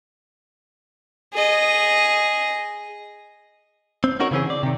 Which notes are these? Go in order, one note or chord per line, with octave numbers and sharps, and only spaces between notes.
G#4 D#5
C4
C#4 D#4 F#4 A#4 C#5
C#3 E3 C4 C#4 G#4
D5
C3 D#3